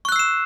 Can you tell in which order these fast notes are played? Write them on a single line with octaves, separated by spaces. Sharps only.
C#6 F#6 E6 C7 E7